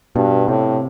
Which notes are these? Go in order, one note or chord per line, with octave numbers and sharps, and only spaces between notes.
G2 B2
A2 C3